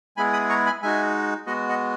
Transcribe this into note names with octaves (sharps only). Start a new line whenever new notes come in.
G#3 B3 E4 G#4 G#5 B5
B5 D#6
A#5 C#6
G#5 B5
G#3 D#4 F#4 E5 G#5
G#3 B3 F#4 D#5 F#5
D#5 F#5